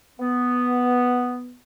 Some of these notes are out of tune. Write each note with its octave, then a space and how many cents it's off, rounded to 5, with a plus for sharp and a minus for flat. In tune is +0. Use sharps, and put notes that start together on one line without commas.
B3 +0